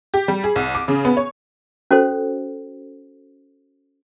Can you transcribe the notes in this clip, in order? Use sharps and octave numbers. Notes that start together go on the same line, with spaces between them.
G4
G3
G#4
C2
D6
C#3
B3
C#5
C#4 F#4 A4 C5